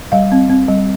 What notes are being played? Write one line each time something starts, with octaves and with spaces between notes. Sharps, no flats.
G3 F5
C4
C4
G3